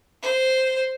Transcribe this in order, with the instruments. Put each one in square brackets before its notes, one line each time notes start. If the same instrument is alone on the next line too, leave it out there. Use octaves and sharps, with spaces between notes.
[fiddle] C5